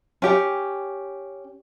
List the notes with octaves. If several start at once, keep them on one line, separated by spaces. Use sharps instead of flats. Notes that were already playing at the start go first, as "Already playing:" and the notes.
C#4 G4 G5